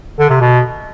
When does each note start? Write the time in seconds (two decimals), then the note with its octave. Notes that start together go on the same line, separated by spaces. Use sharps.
0.19 D3
0.30 C3
0.41 B2